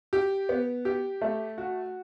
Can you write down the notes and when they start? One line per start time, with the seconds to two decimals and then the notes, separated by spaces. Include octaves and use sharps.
0.13 G4
0.49 B3
0.85 G4
1.21 A3
1.58 F#4